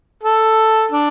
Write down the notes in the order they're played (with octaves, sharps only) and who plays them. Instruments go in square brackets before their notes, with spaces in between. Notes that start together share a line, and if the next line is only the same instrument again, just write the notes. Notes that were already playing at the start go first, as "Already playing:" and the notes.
[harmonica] A4
D4